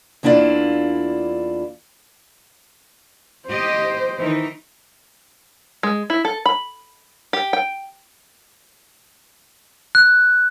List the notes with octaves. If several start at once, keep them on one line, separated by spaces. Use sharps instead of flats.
E2 A#3 D4 E4 F4 D5
G4 C5 D#5
D#3 E3 D#4
G#3
E4
A4
B5
G4
G5
F#6